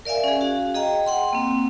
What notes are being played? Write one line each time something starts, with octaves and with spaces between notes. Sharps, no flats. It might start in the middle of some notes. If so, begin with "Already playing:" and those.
A#4 D5 E5 F5 G#5
C#4 G#4
F#4 F5
G#4 D#5 G5 A#5
F#5 G5 C6
A#3 C4